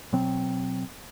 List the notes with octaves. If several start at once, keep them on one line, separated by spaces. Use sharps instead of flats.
B2 F#3 C4